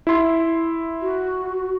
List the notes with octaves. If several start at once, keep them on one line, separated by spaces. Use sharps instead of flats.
E4 C6
F#4